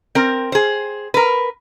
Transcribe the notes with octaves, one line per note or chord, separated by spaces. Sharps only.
C4 A#4
G#4 C5
A#4 B4